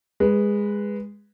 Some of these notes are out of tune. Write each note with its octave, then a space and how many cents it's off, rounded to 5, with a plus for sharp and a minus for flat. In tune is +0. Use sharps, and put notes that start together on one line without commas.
G#3 -15 B4 -5